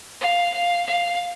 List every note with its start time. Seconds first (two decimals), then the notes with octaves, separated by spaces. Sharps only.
0.21 F5
0.54 F5
0.87 F5